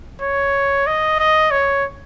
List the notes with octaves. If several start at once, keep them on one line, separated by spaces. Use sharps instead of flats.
C#5
D#5
D#5
C#5